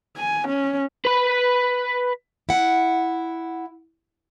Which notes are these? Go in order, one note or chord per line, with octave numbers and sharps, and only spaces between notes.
G#5
C#4
B4 B5
E4 F#5